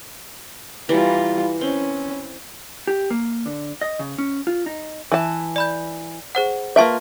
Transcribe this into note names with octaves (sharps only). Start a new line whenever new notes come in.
E3 G3 F4 D5 A#5
C4 C#4
G4
A#3
D3
D#5
C#3
C#4
F4
D#4
E3 A5
D5 B5 G6
G#4 C5 F#5
A#3 F4 B4 E5 A5 C#6